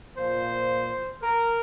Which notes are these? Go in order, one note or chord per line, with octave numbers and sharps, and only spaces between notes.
A#2 F3 C5
A#4